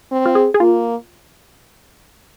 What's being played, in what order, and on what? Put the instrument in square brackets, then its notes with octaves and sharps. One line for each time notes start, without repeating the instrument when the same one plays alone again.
[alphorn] C4
[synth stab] F4
G#4
G#4
[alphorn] A#3 [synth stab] F4